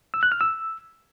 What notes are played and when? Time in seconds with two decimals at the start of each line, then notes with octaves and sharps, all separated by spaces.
0.14 E6
0.23 F#6
0.32 F6
0.41 E6